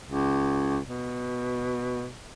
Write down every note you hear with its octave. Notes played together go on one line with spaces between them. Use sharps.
C#2
B2